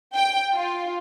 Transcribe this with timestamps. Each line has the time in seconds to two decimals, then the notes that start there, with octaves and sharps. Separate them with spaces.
0.14 G5
0.53 F4